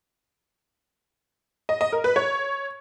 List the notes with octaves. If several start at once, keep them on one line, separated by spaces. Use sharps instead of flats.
D#5
D#5
A#4
B4
C#5